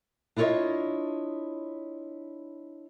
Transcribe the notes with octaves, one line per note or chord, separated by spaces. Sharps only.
D4 E4 F4 A4 C#5 D#5